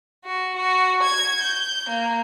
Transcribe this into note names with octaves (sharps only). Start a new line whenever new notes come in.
F#4
F#4
G#6
G6
A#3